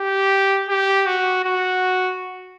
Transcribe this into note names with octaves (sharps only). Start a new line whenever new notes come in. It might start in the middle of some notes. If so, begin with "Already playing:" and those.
Already playing: G4
G4
F#4
F#4